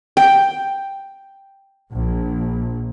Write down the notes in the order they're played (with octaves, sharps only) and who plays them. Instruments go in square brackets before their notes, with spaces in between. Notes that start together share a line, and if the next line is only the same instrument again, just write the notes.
[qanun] G5
[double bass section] A#1